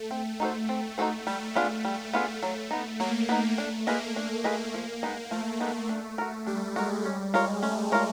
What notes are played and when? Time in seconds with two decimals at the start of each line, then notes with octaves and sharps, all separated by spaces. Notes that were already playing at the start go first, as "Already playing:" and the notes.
Already playing: A3
0.11 C4
0.40 D#4 F#4 A4 C5
0.69 C4
0.98 D#4 F#4 A4 C5
1.27 G3 A3
1.55 B3 D4 F4 G#4
1.85 G3
2.13 B3 D4 F4 G#4
2.42 F#3 A3
2.71 B3 D#4
3.00 F#3 A#3
3.29 B3 D#4
3.58 A3 D4
3.87 A#3 F4 G#4 B4 D#5
4.16 D4
4.44 F4 G#4 B4 D#5
4.74 F3
5.03 G#3 B3 D#4
5.31 F3 A3
5.60 G#3 B3 D#4
5.89 D4
6.18 F#4 A#4
6.47 G3 D4
6.76 G#3 F#4 A#4
7.05 G3 C#4
7.34 G#3 F4 A#4 C#5
7.63 A3 C#4
7.92 F4 A#4 C#5